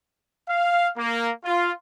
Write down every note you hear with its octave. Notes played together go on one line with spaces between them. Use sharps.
F5
A#3
F4